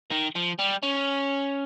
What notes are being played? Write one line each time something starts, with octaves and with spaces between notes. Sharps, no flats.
D#3
F3
G3
C#4